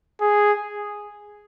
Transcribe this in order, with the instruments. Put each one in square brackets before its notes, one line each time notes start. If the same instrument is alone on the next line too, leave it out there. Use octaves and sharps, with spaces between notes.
[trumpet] G#4